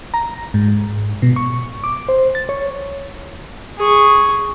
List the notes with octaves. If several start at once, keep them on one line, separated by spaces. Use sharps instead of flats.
A#5
G#2
B2
C#6
D6
C5
A6
C#5
G#4 C#6